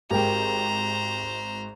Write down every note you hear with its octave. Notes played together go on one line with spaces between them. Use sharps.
G#1 G#2 G4 A#4 C5 G5 A#5